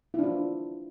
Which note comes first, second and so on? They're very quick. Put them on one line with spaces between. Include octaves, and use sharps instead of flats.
E4 D4 F4